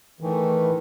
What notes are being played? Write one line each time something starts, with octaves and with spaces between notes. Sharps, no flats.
A2 D#3 E3